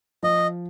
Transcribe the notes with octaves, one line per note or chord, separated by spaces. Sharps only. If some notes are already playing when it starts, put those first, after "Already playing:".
F3 D#5